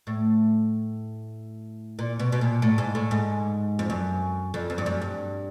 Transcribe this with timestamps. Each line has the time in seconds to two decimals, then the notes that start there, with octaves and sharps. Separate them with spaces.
0.07 A2
1.99 A#2
2.20 B2
2.32 B2
2.41 A#2
2.62 A2
2.78 G#2
2.95 A2
3.11 G#2
3.79 F2
3.90 F#2
4.54 F2
4.70 F2
4.78 G2
4.86 F#2
5.02 G2